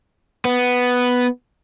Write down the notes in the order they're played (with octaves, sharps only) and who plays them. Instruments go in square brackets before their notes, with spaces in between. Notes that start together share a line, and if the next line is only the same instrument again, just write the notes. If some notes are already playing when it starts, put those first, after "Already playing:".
[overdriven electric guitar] B3